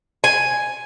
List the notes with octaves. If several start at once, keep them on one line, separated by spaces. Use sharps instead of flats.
G#5